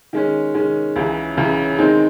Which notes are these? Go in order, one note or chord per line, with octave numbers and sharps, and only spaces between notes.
D#3 G#3 C#4
D#3 G#3 C#4
C#2 C#3 E3
C#2 C#3 E3
D#3 G#3 C4 D#4